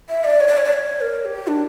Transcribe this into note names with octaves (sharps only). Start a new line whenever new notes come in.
E5
D5
C#5
D5
C#5
D5
C#5
A#4
G4
D4